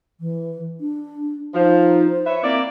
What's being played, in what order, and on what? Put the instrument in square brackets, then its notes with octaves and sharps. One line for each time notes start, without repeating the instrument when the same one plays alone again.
[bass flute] E3
D4
[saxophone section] F3 [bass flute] D#4
[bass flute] C5
[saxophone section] B4 C#5 E5
[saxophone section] A#3 E4 D5 [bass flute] C4